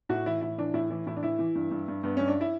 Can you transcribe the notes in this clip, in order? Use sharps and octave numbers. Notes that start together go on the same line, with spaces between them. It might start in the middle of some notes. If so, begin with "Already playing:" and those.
A2 F#4
E3 E4
A2 E4
E3 D4
A2 E4
E3 E4
A2 E4
D4
E3 E4
E3
G2
G2
G2
G2 B3
G2 C#4
D4
E4